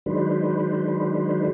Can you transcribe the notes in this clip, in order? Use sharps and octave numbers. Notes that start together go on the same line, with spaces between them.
D#3 F#3 G#3 D4 B4 C5